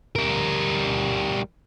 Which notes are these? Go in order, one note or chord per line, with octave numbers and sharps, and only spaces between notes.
G3 A#4